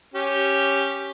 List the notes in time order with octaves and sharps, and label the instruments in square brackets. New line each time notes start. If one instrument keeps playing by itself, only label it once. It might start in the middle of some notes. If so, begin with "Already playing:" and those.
[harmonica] C#4 G4